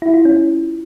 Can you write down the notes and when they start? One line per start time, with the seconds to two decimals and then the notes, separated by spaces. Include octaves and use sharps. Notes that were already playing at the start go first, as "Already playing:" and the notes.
0.02 E4
0.14 F4
0.25 C#4